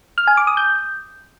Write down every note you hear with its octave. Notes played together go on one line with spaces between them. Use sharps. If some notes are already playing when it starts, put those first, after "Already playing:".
F6
G#5
D6
D#6
G6